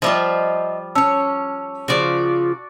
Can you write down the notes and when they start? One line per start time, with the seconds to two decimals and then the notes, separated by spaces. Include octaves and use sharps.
0.02 F3 G3 F4 D#5 E5
0.95 C#4 C#5 A5 E6
1.88 C#3 F3 F4 F#4 D5